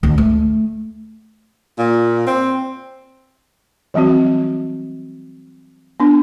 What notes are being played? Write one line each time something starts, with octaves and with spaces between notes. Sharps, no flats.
D2
A3
A#2
C4
E3 F#3 G3 C4 F#4
B3 D4